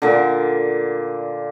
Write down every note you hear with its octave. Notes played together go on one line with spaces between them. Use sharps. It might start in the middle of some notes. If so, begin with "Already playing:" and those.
A#2 D3